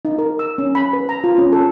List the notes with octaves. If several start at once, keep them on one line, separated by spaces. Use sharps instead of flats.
D#4
A#4
E6
C#4
B5
B4
A#5
F4
C#4
A4